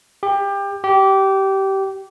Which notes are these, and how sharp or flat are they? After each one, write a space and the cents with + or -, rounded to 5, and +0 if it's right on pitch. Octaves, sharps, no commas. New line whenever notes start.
G4 +25
G4 -20